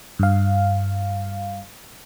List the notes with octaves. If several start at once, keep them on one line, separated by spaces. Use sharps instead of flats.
G2 F5